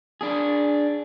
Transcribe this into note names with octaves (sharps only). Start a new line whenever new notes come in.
D4 G#4